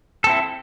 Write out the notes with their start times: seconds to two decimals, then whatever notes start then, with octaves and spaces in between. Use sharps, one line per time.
0.24 A4
0.27 C4
0.29 E4